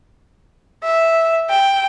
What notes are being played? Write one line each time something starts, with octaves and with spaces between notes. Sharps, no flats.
E5
G5